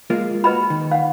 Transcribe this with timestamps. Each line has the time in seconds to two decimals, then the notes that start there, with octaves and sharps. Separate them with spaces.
0.10 G#3 A#3 F4
0.44 F#4 B4 D#5 B5
0.70 D#3
0.92 F5 F#5